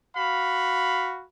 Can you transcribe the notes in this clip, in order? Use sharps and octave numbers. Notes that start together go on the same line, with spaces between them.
F#4 F5 B5